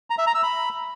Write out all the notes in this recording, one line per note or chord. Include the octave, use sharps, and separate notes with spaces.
A#5
E5
A#5
E6
B5